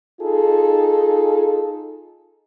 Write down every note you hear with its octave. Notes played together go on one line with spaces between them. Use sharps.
D#4 F4 G#4 A4